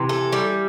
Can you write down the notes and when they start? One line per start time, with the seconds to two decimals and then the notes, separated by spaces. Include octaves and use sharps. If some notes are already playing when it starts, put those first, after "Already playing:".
Already playing: C3 E3
0.09 A4
0.33 G3